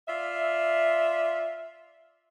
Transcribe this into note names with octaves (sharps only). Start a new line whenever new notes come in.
F4 D5 E5